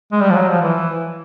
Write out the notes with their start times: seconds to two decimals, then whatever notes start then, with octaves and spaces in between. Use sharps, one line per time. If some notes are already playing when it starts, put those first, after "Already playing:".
0.12 G#3
0.21 G3
0.30 F3
0.35 F#3
0.48 F3
0.62 E3